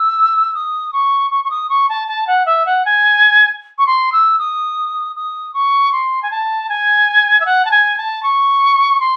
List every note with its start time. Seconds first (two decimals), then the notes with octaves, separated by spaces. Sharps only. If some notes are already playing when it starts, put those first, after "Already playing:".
Already playing: E6
0.54 D#6
0.93 C#6
1.31 C#6
1.44 C#6
1.50 D#6
1.69 C#6
1.89 A5
2.08 A5
2.27 F#5
2.46 E5
2.66 F#5
2.85 G#5
3.78 C#6
3.87 C6
4.12 E6
4.39 D#6
5.16 D#6
5.54 C#6
5.92 C6
6.23 G#5
6.31 A5
6.69 G#5
7.40 E5
7.46 F#5
7.65 A5
7.71 G#5
7.97 A5
8.23 C#6
9.00 C6